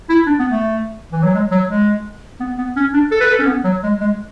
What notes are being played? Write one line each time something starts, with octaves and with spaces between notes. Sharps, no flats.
E4
D4
B3
A3
E3
F#3
G#3
F#3
G#3
B3
B3
C#4
D4
A4
B4
A4
C#4
B3
F#3
G#3
G#3